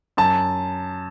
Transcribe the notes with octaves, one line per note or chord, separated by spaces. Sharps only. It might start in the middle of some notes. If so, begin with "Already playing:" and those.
F#2 A5